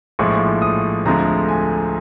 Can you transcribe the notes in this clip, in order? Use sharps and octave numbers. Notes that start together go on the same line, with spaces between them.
A#1 A2 F3 G#3 C#6
D#6
D2 D3 F3 G#3 C4 A#5
G#5